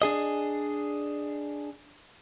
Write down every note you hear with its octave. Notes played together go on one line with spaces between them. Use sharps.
D4 G#4 D#5